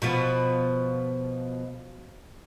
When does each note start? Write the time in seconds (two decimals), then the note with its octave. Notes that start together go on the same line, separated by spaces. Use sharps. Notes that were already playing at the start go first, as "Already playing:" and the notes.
0.02 B2 F3 B3